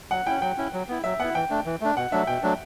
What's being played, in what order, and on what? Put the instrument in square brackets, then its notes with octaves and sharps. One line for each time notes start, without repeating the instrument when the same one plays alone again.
[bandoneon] F#3 [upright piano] F#5
[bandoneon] C#4 E4 [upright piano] G5
[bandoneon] F#3 [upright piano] G5
[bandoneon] C#4 E4
F#3
B3 E4
[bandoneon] F#3 [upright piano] E5
[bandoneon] B3 E4 [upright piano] F#5
[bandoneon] E3 [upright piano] G5
[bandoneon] A3 D4
E3
A3 D4
[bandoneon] B2 [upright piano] F#5
[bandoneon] F#3 A3 D4 [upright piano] E5
[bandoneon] B2 [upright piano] G5
[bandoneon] F#3 A3 D4